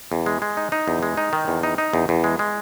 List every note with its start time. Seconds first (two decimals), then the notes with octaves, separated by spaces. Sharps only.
0.12 E2
0.26 G#3
0.42 G#3
0.57 D#4
0.72 D#4
0.88 E2
1.03 G#3
1.17 D#4
1.33 D#3
1.48 E2
1.63 D#4
1.78 D#4
1.93 E2
2.09 E2
2.24 G#3
2.39 G#3